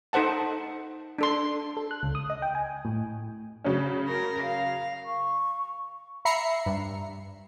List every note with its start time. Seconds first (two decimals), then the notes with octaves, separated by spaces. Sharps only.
0.13 D#4 A4 C5 F#5 A5
1.18 D4 A4 C6
1.77 A4
1.91 F#6
2.03 C#2
2.15 D#6
2.30 D#5
2.42 G5
2.55 G#5
2.85 A2
3.64 C#3 F#3 C#4
4.08 A#4
4.43 F5
5.05 C#6
6.25 E5 A#5 B5 C7 C#7
6.66 G2